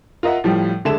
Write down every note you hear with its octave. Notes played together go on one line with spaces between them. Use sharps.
F4 A#4 D#5 E5 F#5
A2 F3 G3
D3 G#3 A3 E5 A5 E7